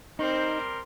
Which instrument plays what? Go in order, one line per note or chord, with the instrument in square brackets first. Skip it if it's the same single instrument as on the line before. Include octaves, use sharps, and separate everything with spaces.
[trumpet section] G3 A#4 C6 [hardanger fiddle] C4 C5 [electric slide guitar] D#4